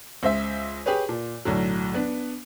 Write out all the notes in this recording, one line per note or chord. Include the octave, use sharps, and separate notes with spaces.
C#2 C5 E5
G4 G#4 B4 C#5
A#2
B1 A2 D3 F#3
B3 D4